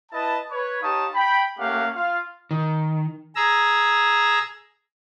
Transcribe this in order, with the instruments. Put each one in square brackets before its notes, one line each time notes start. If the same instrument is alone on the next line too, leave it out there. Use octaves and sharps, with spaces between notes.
[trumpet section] E4 B4 D#5 A5
B4 C#5
D#4 G4 C#5 F5 A5 D#6
G5 B5
A3 A#3 C#4 G4 F5 F#5
F4 F5
[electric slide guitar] D#3
[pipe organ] G#4 A#5 E6